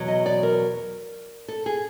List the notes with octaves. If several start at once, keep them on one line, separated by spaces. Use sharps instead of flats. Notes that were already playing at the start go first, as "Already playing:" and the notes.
Already playing: E2 B2 F#3
D#5
D5
A#4
A4
G#4